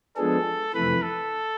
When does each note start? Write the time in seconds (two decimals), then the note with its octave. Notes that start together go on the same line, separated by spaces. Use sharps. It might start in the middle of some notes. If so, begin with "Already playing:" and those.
0.17 F3 G#3 B3 D4 G#4 A4
0.74 F2 C3 E3 A3 B4
1.03 A4